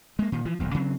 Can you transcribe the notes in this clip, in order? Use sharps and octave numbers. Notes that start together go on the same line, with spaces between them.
G#3 A#3
A#2 D#3
E3 F3
D#1 B1 E2
C#3 F#3 A#3 C4